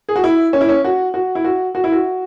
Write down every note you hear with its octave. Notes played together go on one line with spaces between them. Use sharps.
G#4
F#4
E4
C#4
E4
C#4
F#4
F#4
E4
F#4
F#4
E4
F#4